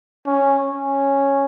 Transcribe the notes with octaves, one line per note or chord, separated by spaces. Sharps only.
C#4
C#4